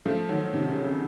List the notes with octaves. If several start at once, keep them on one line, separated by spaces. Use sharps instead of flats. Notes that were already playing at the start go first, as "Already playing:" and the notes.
F3 A3
D#3 F#3
C3 D#3
C#3
C#3